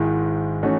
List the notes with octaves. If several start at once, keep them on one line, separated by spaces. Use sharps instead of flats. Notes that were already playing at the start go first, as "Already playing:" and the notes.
Already playing: G#1 G#2 D#3 G#3 E4
E3 A3 C#4 D#4 F#4